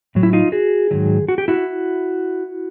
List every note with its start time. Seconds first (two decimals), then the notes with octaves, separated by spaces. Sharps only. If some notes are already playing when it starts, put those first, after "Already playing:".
0.15 A2 F#3
0.23 E4
0.33 D#4 F4
0.52 F#4 G#4
0.91 G#2 D#3 F#3
1.28 F#4
1.38 G4
1.48 E4 F#4